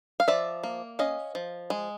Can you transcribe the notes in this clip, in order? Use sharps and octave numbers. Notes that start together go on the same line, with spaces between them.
F5
F3 D5 E5
A#3
C#4 D#5 F5
F3
G#3